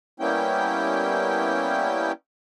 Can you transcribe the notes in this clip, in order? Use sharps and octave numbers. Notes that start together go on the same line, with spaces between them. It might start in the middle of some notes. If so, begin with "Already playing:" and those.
G3 A#3 B3 C#4 E4 G5